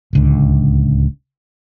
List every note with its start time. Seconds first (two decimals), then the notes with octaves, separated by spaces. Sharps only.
0.13 D1 C#2 D3